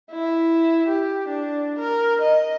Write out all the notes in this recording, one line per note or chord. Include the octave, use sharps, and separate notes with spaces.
E4
G4
D4
A#4
D#5